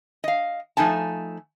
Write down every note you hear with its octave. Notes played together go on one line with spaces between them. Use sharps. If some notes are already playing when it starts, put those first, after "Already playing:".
D#5 F5
F3 A3 D#4 G#5 A5